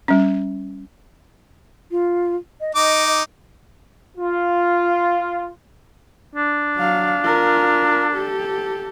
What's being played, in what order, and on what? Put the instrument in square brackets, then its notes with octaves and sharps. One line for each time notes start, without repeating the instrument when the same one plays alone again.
[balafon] G3 C#4
[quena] F4
D#5
[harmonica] D#4 D6 [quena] D#5
[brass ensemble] F4
[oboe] D4
[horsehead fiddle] F#3 F5
F4 A#4
G4 A4